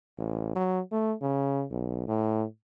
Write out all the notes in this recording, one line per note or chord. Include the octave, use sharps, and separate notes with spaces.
A1
F#3
A3
C#3
B1
A2